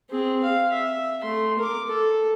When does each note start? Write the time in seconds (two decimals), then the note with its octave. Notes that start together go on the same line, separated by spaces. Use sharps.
0.11 C4 G#4
0.44 F5
0.73 E5
1.23 A3 C6
1.59 A#4 D6
1.88 A4